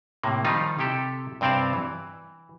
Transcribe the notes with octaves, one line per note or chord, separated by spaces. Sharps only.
A2 C3 A#3
D#3 F3 G3 D#4 F4
C3 E4 G4 A4
G2 C3 C4 D5 F5 A5
E3